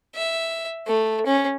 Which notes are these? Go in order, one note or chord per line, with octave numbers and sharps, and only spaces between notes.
E5
A3
C#4